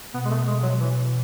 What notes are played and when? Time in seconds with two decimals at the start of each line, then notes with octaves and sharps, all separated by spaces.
0.14 B2 B3
0.25 G#3
0.30 A3
0.47 G#3
0.63 F#3
0.79 E3